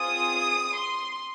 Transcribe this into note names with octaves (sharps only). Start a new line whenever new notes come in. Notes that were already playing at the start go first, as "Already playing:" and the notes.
Already playing: C4 F4 G#4 D#6
C6